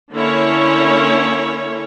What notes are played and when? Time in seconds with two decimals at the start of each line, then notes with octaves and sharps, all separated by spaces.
0.13 D3 A#3 C#4 E4 C#5